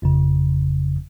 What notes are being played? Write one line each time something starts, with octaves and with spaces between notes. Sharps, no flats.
G1 F2 C#3